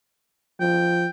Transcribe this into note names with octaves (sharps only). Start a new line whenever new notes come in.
F3 G5